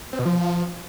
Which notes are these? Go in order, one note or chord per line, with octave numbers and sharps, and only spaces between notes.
C4
B2
F3